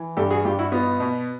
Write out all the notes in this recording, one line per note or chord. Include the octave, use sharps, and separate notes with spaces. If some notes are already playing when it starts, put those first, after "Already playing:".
Already playing: E3
G2 G4 A4
F#4 G#4
G2 F4 G4
E4 F#4
B3 D#4 F4
B2